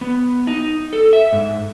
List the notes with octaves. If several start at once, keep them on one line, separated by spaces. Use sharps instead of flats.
B3
D#4
A4
E5
G#2